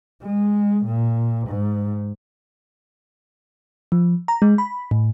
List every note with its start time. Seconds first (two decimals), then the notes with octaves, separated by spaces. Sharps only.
0.22 G#3
0.86 A#2
1.48 G#2
3.92 F3
4.28 A#5
4.42 G#3
4.58 B5
4.91 A2